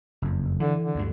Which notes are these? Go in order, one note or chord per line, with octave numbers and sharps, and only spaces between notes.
F#1 F2
D3 E3
D3
D2 G2